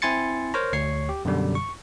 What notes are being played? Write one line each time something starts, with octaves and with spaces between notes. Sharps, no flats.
C4 E4 G#5 C6 A6 C#7
A#4 C5 C#5 A#5
D2 C#5 C#6 C7
G4
F#2 B2 D3 G3
C#6